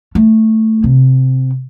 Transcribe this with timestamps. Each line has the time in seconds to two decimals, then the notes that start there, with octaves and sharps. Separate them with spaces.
0.15 A3
0.84 C3